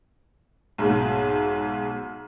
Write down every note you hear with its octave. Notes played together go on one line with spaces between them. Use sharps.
B1 G#2